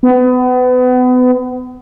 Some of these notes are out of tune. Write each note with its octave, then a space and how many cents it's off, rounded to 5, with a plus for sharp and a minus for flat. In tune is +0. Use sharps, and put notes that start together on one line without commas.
B3 +30